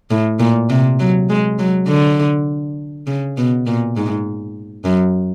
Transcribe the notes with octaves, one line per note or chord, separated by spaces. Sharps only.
A2
A#2
C3
F#3
G#3
F#3
D3
C#3
B2
A#2
G#2
F#2